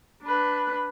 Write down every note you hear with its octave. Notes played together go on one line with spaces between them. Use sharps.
D4 B4